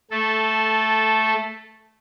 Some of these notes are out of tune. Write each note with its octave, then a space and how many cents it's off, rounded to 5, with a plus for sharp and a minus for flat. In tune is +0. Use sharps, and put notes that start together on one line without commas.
A3 +0 A4 -10